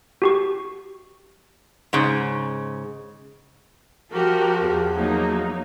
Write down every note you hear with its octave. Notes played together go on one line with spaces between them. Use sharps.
F#4 G4 C#6
G#2 C#3
F3 F#4 G4 A#4
E2
F#3 A#3 D#4